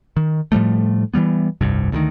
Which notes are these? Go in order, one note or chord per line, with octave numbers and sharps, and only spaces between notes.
D#3
A2 F3 G3 A3
E3 F#3 G3 B3
F1 C2 G2
D2 A#2 D#3